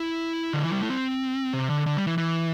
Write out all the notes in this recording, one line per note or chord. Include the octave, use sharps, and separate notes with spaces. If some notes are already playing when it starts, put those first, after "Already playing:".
Already playing: E4
D3
E3
G3
A3
C4
C3
D3
D3
G3
E3
E3